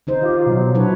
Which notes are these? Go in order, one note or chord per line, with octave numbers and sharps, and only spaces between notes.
D#3 D#4 C5
F4 G4
B2 F#3
F#3 D4 E4 B4 C#5